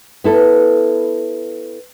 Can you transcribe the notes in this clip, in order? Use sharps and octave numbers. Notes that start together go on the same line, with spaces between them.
B3 E4 A4